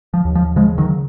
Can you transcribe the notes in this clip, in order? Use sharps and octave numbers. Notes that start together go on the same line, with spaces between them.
F3
D#2
F3
C#3 F3 G#3
D#3 F#3